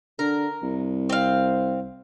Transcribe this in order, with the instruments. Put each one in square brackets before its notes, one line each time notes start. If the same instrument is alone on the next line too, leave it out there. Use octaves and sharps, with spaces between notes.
[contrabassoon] D3 [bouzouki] A#4
[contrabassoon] C2
[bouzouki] C4 F5